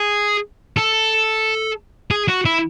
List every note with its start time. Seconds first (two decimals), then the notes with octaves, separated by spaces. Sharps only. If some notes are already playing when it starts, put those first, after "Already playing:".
Already playing: G#4
0.77 A4
2.11 G#4
2.28 F#4
2.45 E4